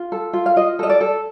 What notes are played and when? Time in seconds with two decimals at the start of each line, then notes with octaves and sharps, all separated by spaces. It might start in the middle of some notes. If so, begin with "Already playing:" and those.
Already playing: F4
0.12 A4
0.33 F4
0.46 F5
0.56 F4 D#5
0.79 A4 D#5
0.90 D5
1.01 A4